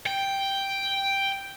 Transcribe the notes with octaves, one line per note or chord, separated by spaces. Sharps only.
G5